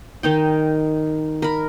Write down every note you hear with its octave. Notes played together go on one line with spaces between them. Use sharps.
D#3 D#4 G5
A#4 B5